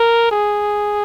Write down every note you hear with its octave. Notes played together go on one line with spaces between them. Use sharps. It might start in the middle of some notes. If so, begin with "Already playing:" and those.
Already playing: A#4
G#4